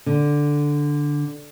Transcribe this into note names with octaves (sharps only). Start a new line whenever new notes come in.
D3